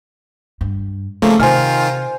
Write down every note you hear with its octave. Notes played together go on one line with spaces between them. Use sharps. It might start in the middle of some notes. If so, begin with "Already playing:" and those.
G2
C#3 F3 A3 A#3 D#4
C3 D#3 F4 C5 G#5 F6